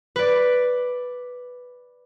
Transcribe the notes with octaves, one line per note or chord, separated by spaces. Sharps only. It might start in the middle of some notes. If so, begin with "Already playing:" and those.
B4 D5